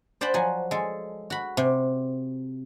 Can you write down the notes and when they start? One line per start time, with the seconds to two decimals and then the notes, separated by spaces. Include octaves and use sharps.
0.21 C5 D5 F#5 G5 A5 B5
0.34 F3 F#3 F#5 G#5
0.71 G#3 A4
1.30 F#4 B5
1.57 C3